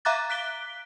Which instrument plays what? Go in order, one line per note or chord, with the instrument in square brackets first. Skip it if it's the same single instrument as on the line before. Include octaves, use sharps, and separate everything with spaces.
[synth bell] E5 F5 A#5 D6 F#6 A6
F#6 B6 D7 G7